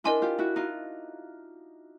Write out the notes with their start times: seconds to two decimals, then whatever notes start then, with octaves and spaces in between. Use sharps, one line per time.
0.04 D4 E4 A#4 D#5 G#5 C6
0.22 F4 G4
0.38 E4 F#4
0.56 D#4 F4